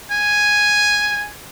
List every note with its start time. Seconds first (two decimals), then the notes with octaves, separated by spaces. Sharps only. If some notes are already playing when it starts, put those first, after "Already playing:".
0.12 G#5